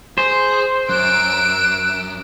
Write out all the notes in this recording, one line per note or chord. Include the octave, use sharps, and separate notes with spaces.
G#4 C5
F#2 E6 F#6 D7